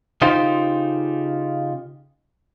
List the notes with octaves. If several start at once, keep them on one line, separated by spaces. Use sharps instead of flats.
C#3 D#4 F4 G4 C5